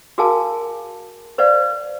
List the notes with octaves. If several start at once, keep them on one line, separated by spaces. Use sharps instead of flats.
F#4 G#4 A#4 F5 G#5 A5
B4 C5 D5 F5